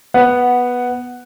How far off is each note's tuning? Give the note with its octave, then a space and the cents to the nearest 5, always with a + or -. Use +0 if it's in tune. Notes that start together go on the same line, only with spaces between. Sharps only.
B3 -5 F#5 +0